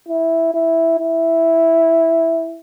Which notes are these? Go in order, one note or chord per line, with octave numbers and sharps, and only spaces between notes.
E4
E4
E4